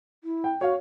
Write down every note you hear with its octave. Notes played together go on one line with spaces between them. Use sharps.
E4
G5
F#4 C#5 F5